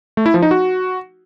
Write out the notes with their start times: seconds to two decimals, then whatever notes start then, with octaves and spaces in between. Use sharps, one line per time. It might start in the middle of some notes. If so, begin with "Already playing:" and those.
0.17 A3
0.26 E4
0.34 F3
0.42 D#4
0.51 F#4